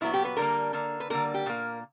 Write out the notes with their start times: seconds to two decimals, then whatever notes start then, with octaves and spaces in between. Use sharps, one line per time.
0.01 A#2 F#3 B3 E4
0.14 G4
0.25 B4
0.37 D3 G3 A#3 A#4
0.73 D3 A#3
1.00 B4
1.10 D3 G3 A#3 A#4
1.34 G4
1.46 A#2 A#3